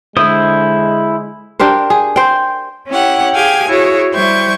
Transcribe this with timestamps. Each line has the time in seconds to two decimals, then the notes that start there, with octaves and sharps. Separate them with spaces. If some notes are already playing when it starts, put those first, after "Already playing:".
0.17 D3 G#3 E4 C5 D#6
1.59 D4 G4 A#4 C5
1.90 G#4
2.16 C5 G5
2.89 C#4 E4 G4 F#5
3.34 G4 G#4 F5 G5 G#5 G#6
3.67 E4 F#4 G#4 C#5
4.14 G3 E4 C5 G5 C#6 G#6